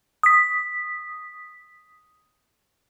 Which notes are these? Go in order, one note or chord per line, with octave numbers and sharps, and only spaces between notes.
D#6 B6